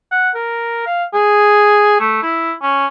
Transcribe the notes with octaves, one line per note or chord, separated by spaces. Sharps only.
F#5
A#4
F5
G#4
A3
E4
C#4